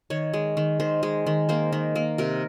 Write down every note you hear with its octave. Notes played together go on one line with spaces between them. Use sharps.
D#3 C#5
G#3
D#3
D#3 C5
G#3
D#3
A#3 C5
D#3
A#3
C3 A#4